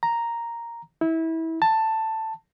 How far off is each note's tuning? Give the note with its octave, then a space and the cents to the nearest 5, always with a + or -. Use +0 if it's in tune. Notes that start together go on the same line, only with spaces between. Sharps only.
A#5 +0
E4 -25
A5 +10